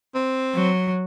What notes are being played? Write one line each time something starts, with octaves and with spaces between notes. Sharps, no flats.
C4
F#3